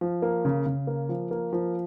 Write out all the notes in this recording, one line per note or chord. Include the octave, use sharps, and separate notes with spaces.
F3
A#3
C#3
C#3
A#3
F3
A#3
F3